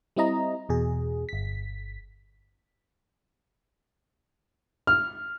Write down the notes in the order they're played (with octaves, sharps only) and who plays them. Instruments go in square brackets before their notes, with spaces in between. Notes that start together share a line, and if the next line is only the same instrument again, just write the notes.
[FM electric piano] G3 C4 E4 D#5 A#5
E2 B2 G#4
G1 B6
[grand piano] F6